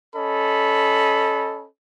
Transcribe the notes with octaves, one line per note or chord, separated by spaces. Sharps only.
C#4 A4 D#5 B5